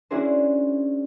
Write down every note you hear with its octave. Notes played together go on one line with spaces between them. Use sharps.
C#4 D4 E4 F#4 G#4 C5